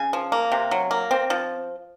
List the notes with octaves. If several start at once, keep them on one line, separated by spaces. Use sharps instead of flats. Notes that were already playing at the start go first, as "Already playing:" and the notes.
Already playing: C#3 G#5
F3
A#3
C3
F#3
A#3
C4
F3